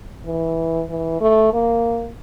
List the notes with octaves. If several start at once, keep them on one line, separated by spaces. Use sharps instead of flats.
E3
E3
A3
A#3